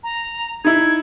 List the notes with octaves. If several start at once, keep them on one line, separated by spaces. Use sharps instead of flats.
A#5
D#4 E4 G#6